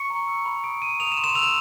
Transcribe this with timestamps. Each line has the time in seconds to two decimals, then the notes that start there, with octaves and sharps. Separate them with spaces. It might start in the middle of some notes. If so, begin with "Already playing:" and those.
Already playing: C#6 C#7
0.10 A#5
0.28 E6
0.45 B5
0.64 D#6 D7
0.82 A#5 D#7
1.00 D#6 F7
1.12 E7
1.17 C6
1.24 E7
1.35 E6 F7